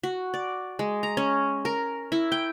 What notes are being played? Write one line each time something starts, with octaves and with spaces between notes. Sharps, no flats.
F#4
D5
G#3
A#5
C#4
A#4
E4
G5